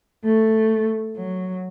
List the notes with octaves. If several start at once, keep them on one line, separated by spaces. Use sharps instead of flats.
A3
F#3